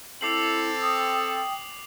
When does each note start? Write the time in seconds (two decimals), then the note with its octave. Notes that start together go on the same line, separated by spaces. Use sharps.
0.21 C4 E4 A4 D6 C7 F#7
0.82 G5 D#6